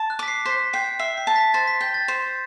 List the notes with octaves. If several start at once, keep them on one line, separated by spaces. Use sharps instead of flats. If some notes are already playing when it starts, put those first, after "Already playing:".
Already playing: A5
F#6
D6 B6
C7
C5 B6
G5 C7
E5 C7
C7
A5
B6
C5 A6
B6
G5 G6
A6
C5